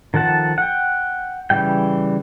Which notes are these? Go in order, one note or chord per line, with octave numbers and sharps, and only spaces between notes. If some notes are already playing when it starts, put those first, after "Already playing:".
D#3 F3 A4 F#5 A5
F#5 G5
C#3 E3 G3 G5